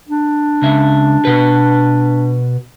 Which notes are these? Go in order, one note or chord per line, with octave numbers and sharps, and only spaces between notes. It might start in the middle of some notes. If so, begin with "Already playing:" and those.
D4
C#2 C#3 E5
B2 B4